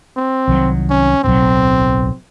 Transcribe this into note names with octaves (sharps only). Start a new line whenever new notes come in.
C4
C2 D#3 F#3
C#4
D1 B1 F#3 C4